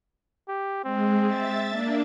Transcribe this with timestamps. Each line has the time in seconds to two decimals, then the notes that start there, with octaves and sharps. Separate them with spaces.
0.48 G4
0.84 G#3 C4
1.25 E5 A6
1.68 A#3 D4